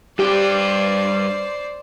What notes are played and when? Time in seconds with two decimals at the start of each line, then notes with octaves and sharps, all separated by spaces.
0.19 G2 G4 C5 D5 G5